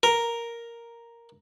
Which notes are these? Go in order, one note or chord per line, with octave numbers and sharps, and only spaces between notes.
A#4